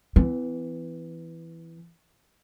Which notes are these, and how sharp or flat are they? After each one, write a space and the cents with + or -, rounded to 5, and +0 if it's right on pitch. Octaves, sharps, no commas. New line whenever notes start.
E3 +5 B3 +45